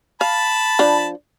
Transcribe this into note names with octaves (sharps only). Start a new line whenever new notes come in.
F5 A5 B5
F3 D4